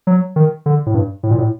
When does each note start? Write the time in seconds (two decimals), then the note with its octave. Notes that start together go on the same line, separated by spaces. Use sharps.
0.07 F#3
0.36 D#3
0.66 D3
0.86 A2
0.94 G2
1.23 A2
1.31 A#2
1.38 A2